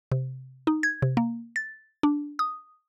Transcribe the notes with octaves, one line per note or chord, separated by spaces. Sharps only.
C3
D#4
G#6
C3
A#3
A6
D4
D#6